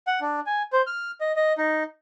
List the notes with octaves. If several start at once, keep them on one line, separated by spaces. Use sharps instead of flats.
F#5
D4
G#5
C5
F6
D#5
D#5
D#4